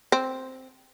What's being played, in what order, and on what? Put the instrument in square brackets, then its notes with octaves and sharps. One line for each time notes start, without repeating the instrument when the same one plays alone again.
[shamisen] C4